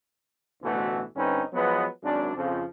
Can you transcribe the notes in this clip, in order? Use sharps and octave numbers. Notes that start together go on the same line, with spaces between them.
A1 D2 B2 E3 A3 F#4
G2 D3 C4 C#4 D#4 B4
F3 F#3 G#3 B3
G#1 F#2 D4
F2 C#3 F3